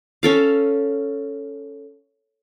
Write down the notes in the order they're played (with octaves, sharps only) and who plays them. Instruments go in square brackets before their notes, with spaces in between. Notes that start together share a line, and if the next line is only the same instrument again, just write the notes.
[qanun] C#4 A4 F5